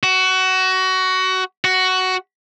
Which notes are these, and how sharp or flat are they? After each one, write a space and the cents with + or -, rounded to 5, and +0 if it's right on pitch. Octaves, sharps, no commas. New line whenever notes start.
F#4 +20
F#4 +10